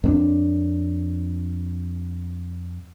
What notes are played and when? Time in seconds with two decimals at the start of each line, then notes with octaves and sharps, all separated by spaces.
0.04 F2 B3 D4